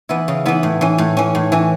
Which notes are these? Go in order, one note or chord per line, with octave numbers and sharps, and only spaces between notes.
E3 B3 E4
C#3
E3 B3 E4
A2
E3 C#4
A2
E3 C#4
A2
E3 C#4